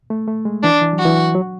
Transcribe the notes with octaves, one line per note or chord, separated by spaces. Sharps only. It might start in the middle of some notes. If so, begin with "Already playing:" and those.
A3
A3
G#3
E3 D4
E3
F#3
F#4
E3
F#3